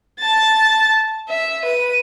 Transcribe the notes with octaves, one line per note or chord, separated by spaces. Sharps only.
A5 A6
E5
B4 D#7